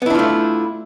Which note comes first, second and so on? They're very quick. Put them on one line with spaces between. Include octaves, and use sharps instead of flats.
B3 E4 D4 F4 A3